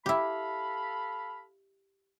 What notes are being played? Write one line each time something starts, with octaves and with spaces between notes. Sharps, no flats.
E4 G4 A4 F5 B5